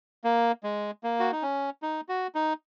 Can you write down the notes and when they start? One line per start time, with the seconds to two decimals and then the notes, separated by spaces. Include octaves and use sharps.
0.24 A#3
0.63 G#3
1.04 A#3
1.20 F#4
1.32 D#4
1.42 C#4
1.82 D#4
2.09 F#4
2.35 D#4